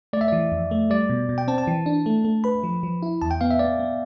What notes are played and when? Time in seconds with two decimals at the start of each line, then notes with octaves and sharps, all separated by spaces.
0.13 A3 D5
0.21 E5
0.28 E3 D5
0.52 F2
0.71 A3
0.90 G3 D5
1.10 B2
1.29 B2
1.38 G5
1.48 C4 A5
1.58 A5
1.67 E3
1.86 D4
2.06 A3
2.25 A3
2.44 B4 B5
2.63 F3
2.83 F3
3.02 E4
3.22 E2 A5
3.31 G5
3.41 B3 F5
3.51 E5
3.59 B3 D5
3.79 B3